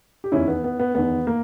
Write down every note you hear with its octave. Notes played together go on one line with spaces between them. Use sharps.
G4
E2 D#3 C#4 E4
B3
B3
B3
E2 D#3 B3
A#3